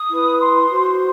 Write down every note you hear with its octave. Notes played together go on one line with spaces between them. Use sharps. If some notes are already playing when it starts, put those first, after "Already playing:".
Already playing: D#6
E4 B4
C6
F#4 C5